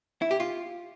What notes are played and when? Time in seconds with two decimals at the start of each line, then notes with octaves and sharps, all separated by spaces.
0.22 E4
0.31 G4
0.40 F4